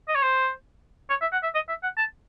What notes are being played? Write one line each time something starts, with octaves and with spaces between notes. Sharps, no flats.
D#5
C#5
C5
C#5
E5
F#5
E5
D#5
E5
F#5
A5